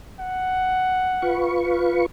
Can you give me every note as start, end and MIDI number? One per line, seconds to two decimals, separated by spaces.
0.20 1.60 78
1.22 2.06 65
1.22 2.06 71
1.22 2.06 85